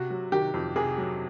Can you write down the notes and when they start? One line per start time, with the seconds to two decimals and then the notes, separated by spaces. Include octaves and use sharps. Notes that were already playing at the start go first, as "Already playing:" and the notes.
Already playing: C3 F#4
0.10 F#3
0.32 D#3 G4
0.54 F2
0.76 C3 G#4
0.98 F#3